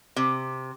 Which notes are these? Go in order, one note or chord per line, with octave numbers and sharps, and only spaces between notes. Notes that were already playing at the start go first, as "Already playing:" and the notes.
C3